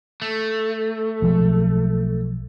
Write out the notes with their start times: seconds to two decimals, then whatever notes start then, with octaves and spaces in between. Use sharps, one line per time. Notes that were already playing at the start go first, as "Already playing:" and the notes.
0.22 A3
1.22 B1 F3 G#3